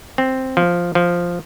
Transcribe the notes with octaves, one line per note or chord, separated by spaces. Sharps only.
C4
F3
F3